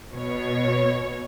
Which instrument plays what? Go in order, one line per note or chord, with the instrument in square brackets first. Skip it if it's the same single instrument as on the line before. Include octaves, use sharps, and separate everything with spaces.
[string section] B2 C#5